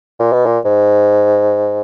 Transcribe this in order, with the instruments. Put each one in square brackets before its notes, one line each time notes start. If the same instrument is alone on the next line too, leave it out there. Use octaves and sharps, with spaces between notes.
[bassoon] A#2
B2
A#2
G#2